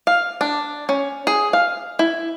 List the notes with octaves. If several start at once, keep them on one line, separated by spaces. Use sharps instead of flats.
F5
D4
C#4
G#4
F5
E4